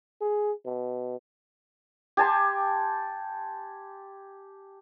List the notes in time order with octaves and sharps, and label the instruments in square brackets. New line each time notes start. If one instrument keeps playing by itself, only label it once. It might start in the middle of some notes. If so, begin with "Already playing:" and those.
[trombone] G#4
B2
[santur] G4 G#5 A5 C6